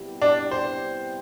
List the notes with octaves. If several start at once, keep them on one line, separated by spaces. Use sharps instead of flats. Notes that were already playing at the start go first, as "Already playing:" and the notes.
Already playing: C3 G3 B3 E4 G4
D4
C5